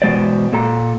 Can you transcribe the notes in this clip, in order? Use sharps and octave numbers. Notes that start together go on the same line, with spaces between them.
E2 B2 G#3 C5 D5
A#2 A4 A#5